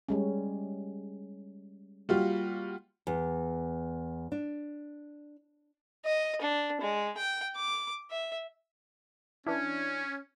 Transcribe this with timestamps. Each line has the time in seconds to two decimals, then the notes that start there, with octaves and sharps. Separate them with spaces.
0.09 G3 G#3 C#4
2.09 G3 A#3 F4 F#4
3.07 E2
4.32 D4
6.05 D#5
6.42 D4
6.81 G#3
7.18 G5
7.57 D6
8.10 E5
9.47 E3 C#4 D4 E4